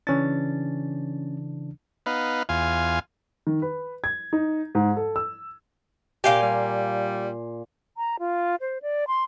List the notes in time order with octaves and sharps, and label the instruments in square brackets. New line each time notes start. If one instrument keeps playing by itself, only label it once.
[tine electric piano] C#3 E3 D4 [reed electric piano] C#4 A6
[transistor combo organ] B3 D#4 B4 F5
E2 F4 F5 G#5
[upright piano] D#3
B4
G#6
D#4
G#2
A4
E6
[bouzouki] A#2 F5 G#5 [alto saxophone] G4
[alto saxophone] G3
[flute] A#5
F4
C5
D5
C6